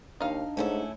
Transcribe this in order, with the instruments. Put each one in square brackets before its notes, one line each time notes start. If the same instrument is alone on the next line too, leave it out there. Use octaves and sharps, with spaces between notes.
[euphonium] D#2 [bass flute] D4 [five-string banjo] D#4 F5
[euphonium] G#2 [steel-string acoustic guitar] A3 C#4 E4